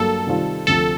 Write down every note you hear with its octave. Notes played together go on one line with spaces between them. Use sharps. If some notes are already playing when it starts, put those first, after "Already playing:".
Already playing: G2 F#3 A#3 A4
C3 D#3 G3 C4 F4
D2 C3 F3 A4